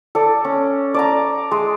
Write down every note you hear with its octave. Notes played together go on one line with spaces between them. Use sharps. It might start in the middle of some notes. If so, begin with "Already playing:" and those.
A4 D5
C#4
D5 A5 A#5
G#3